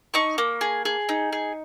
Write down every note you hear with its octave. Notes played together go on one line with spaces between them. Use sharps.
D#4 C#6
A#3
G#4
G#4
D#4
G#4